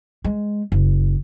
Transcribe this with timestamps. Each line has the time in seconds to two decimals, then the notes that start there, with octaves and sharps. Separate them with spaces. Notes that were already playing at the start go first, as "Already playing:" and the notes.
0.24 G#3
0.72 F#1